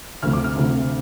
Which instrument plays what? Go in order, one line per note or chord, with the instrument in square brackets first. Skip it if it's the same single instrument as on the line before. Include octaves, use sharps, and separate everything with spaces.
[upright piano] D2 C3 F3 A3 F6
D6
F6
D2 C3 F3 A3